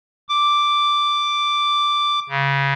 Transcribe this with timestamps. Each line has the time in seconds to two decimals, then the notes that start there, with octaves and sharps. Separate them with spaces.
0.29 D6
2.29 C#3